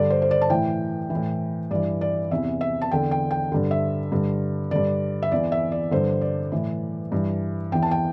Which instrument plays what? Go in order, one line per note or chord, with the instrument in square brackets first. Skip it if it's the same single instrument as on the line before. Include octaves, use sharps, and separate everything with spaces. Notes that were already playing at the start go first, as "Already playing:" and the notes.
Already playing: [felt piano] G2 D3 D5
C5
C5
D5
A5
A2 E3 G5
E3
A2
G2 E3 D5
D5
E2 C3 E3 E5
E5
A5
E2 D3 G5
G5
G5
G2 D3
E5
G2 D3
G2 D3 D5
E5
E2 E3 D5
E5
D5
G2 D3 C5
D5
A2 E3
G2 E3
E2 E3 G5
A5
G5